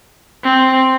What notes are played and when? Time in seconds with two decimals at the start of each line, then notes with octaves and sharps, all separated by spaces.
0.44 C4